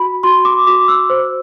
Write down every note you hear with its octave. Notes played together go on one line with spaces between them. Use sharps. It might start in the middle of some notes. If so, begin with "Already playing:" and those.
Already playing: F#4 B5
F#4 C6
D6
F#4 D6
E6
C5